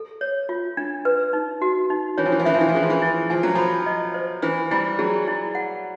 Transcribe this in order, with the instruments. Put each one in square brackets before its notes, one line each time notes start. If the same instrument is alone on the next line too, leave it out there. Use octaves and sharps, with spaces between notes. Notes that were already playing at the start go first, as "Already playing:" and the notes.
Already playing: [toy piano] A4
C#5
F4
D4
B4
D#4
F#4
D#4
[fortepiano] E3 [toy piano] C#5
[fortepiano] F3
E3
F3
[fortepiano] E3 [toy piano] E5
[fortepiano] F3
E3
F3
[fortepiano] E3 [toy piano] G#4
[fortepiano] F3
E3
[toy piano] E4
[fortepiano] F3 [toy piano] G#5
[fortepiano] F#3
[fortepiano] F3 [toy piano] B5
[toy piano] D#5
C5
[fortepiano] E3 [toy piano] C5
[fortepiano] G3 [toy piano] E4
[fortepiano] F#3 [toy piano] G#4
[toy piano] E4
F#5